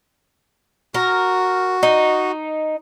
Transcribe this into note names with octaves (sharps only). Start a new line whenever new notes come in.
F#4 A#4
D#4